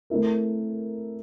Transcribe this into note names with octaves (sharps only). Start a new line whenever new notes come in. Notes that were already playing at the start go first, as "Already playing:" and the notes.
A3 C4 E4 A#4